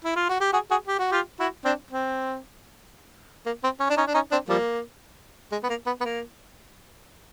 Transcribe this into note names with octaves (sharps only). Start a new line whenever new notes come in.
E4
F4
F#4
G4
F#4 G#4
F#4 G#4
G4
F#4
F4 G4
E4 F#4
C4 D4
C4
A#3
C4
C#4
D4
C#4 D#4
D4
C#4 D#4
C4 D4
F3 G3 A#3
G#3
B3
A#3
B3
B3
A#3